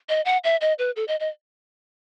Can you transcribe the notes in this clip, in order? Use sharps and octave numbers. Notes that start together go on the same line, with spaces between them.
D#5
F#5
E5
D#5
B4
A4
D#5
D#5